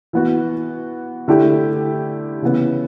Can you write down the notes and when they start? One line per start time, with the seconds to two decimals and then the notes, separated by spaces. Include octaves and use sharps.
0.13 E3 B3 F#4
1.28 D3 A3 E4 G4
2.42 C#3 E3 B3